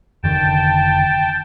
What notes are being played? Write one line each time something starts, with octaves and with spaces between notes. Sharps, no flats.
F1 D3 D#3 G5 A5